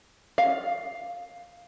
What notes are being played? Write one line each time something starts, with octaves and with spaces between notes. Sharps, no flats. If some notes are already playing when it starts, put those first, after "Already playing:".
F5